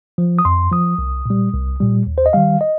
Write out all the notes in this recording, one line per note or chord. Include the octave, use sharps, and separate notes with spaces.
F3
D#6
F2 C6
F3 D#6
C2
A#2 G3
C2
A#2 G3
D#2
C5
D#5
D#3 G3 F5
D#5